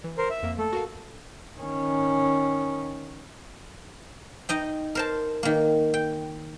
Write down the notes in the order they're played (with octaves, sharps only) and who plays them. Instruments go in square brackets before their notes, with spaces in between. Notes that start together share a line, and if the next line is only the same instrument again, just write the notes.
[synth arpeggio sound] E3
[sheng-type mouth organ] A#4 C5
E5
[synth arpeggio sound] F2 A#3
[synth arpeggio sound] A3 [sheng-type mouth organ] A4
[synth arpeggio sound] F#4 A#4 F5
[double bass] D#3 C#4
[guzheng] D#4 D#5 G5
A#4 C5 A5
D#3 A#3
G5